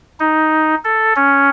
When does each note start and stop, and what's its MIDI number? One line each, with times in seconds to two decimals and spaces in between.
0.20 0.75 63
0.85 1.14 69
1.16 1.50 61